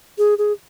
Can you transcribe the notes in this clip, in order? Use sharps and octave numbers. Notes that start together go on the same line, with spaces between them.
G#4
G#4